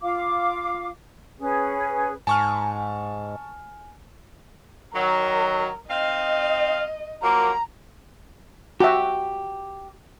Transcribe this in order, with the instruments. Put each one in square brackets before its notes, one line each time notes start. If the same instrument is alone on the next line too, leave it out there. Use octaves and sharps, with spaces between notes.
[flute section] F4 F5 D6
C#4 G#4 B4
[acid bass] G#2 [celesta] G#5 [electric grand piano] A5 C#6 F6
[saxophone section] D#3 F#3 [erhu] A#4
[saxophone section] C4 D#4 F5 [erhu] D#5
[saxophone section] F3 F#3 A#3 [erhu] A#5
[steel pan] F#4 E5 [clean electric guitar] G4